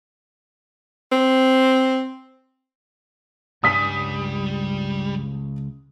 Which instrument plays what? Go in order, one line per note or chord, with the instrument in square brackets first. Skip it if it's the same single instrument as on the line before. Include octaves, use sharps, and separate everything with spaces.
[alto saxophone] C4
[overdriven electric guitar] C#2 G#5 [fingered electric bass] G2 [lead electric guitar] G3 [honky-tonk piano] D#6 B6